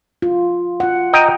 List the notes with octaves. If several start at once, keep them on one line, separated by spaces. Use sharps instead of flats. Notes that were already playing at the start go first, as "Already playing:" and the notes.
F4
F4 F#5
D#5 G5 A#5